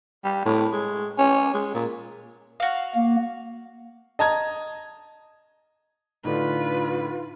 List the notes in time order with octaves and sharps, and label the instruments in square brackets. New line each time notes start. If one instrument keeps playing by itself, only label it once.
[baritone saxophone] G3
A2
G#3
C#4
G#3
A#2
[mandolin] F#4 F5
[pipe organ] A#3
[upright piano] D#5 A5 A#5 G#6
[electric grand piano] A2 D3 D4 [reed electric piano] D#4 [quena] F4 [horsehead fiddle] B4